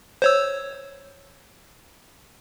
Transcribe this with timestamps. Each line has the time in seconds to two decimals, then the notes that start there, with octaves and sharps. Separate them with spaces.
0.22 C5 C#5 E6